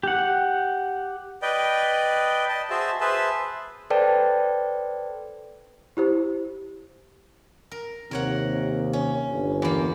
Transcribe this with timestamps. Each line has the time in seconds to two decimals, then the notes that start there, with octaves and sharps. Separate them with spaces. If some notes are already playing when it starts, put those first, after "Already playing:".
0.03 G4 F#5
1.42 B4 D5 D#5 G5
2.49 D#5 A5
2.70 F#4 G#4 C5 E5 A5
3.00 G#4 B4 C5 E5 A5
3.90 A4 B4 C5 D5 G5 A5
5.97 E4 G4 C5
7.71 A#4
8.11 D#2 C3 A#4 C#5 F#5
8.93 C#4
9.30 G1
9.62 E2 A#3